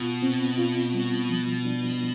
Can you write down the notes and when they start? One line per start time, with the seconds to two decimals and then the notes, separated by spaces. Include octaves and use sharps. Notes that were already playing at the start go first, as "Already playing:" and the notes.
Already playing: B2 F4
0.22 C4
0.58 F4
0.94 G3
1.30 F3
1.65 D4